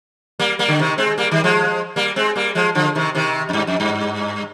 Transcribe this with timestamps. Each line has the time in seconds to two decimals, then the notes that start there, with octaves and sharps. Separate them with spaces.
0.40 G3 A#3
0.59 G3 A#3
0.68 D3
0.79 C3 D#3
0.98 G#3 C4
1.18 G3 A#3
1.31 D#3 G3
1.44 F3 G#3
1.96 G3 A#3
2.16 G#3 C4
2.36 G3 A#3
2.55 F3 G#3
2.75 D3 F3
2.95 C3 D#3
3.15 C3 D#3
3.49 F2
3.53 G2
3.67 F2
3.80 G2